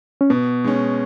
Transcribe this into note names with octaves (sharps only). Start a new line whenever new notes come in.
C#4
B2 B3
G#3 C#4